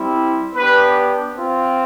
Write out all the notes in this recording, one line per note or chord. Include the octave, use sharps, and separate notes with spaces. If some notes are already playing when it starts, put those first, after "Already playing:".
Already playing: G3 C4 E4
B3 D4 G4 B4
C4 F4